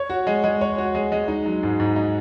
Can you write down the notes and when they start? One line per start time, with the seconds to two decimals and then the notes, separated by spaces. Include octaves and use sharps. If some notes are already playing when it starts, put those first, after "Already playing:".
Already playing: C#5
0.10 F#4
0.27 G#3
0.44 G#3
0.61 C#5
0.78 F#4
0.95 G#3
1.12 G#3
1.28 D#4
1.46 F#3
1.63 G#2
1.80 G#2
1.96 D#4